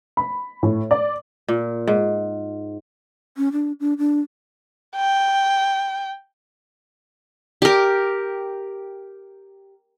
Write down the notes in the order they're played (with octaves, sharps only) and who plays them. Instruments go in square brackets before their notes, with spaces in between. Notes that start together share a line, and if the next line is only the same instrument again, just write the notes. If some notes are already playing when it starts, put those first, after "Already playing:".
[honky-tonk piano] B5
A2
D5
[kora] A#2
G#2
[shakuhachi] C#4
D4
D4
D4
[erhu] G5
[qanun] G4 A#4